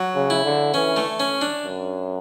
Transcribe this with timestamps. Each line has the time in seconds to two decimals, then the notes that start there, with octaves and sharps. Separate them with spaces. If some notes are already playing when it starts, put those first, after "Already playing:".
Already playing: F#3
0.15 C#3
0.30 E4
0.45 D3
0.74 E3 C#4
0.96 A3
1.20 C#4
1.41 D4
1.64 F#2